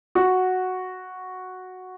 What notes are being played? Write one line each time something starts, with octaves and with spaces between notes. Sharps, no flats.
F#4